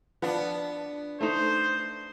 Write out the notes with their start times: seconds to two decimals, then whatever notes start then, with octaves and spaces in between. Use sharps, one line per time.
0.22 F3 B3 D4
1.21 A3 D#4 C5